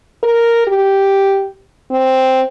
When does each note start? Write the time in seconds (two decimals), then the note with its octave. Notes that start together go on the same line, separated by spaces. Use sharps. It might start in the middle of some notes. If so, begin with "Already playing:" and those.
0.23 A#4
0.67 G4
1.91 C4